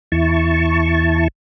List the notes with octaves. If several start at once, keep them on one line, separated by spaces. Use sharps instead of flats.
E2 E4 A5 C#6